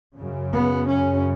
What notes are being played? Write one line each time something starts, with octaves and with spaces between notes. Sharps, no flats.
F#2 C#3
B3
C#4